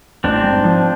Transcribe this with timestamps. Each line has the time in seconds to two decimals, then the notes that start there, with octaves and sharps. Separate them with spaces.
0.24 A1 C4 D4
0.44 G#2
0.64 F3